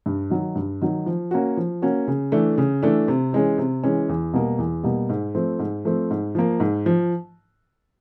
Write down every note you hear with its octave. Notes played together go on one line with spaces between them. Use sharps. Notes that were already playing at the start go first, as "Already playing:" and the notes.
G2
D#3 F#3
G2
D#3 F#3
F3
A#3 C#4 F#4
F3
A#3 C#4 F#4
C#3
E3 A3 D4
C#3
E3 A3 D4
C3
E3 G#3 C#4
C3
E3 G#3 C#4
E2
B2 G3 A#3
E2
B2 G3 A#3
G#2
F3 A3 C4
G#2
F3 A3 C4
G#2
F3 A#3
G#2
F3